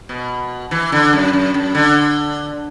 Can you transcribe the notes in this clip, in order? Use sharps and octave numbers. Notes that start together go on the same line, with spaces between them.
B2
E3
D3
F#2
F#2
F#2
D3